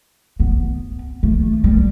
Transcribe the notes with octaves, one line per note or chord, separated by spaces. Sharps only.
B3
A3
G3